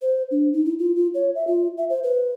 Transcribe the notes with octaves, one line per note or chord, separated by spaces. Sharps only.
C5
D4
D#4
E4
F4
F4
C#5
E5
F4
E5
C5
B4